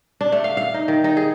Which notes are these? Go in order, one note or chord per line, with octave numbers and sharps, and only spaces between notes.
D4
A3
F5
F5
D#4
D#3
D#4
G#4